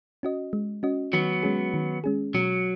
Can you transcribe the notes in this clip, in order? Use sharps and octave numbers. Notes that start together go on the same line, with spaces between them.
C#4 F#4 D#5
G#3
C#4 F#4 D#5
D#3 F#3 B3
G#3 C#4 G#4
D#3
G#3 C#4 G#4
B2 F#3